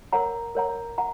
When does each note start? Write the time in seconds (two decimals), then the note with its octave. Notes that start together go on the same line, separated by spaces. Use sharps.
0.13 A#4 C#5 F#5 A#5
0.55 A#4 C#5 F#5 A#5
0.98 F#5 A#5